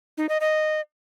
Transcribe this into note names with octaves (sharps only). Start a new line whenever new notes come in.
D#4
D#5
D#5